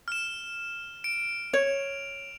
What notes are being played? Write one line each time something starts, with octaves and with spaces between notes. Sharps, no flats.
F6 E7
D7
C#5 F7